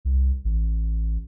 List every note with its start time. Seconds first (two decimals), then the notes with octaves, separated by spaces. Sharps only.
0.05 C2
0.45 A1